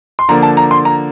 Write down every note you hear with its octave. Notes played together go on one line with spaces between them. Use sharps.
C6
D3 F3 A#3 D4 A#5
A5
A#5
C6
A#5